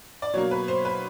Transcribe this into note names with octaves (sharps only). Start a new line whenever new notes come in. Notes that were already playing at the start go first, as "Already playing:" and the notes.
D5
B2 F#3 A#3 C#5
B4
C5
B4